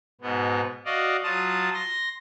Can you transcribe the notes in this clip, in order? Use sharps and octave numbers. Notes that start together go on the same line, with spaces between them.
G#2 B2 B3
F#4 D5 D#5 F5
F#3 F4 A5 D#6
C6 A#6